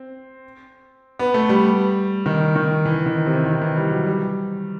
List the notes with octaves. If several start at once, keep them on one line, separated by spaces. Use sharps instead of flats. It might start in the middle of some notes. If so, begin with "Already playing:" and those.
Already playing: C4
B3
A3
G3
D#3
D#3
E3
D#3
C3
D#3
E3
G3
F#3
G3